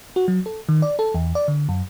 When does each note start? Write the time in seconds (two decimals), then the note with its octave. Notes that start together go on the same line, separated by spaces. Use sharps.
0.16 F#4
0.28 F#3
0.46 A4
0.69 D#3
0.82 D5
0.99 A4
1.14 E2
1.35 D5
1.48 D3
1.69 F#2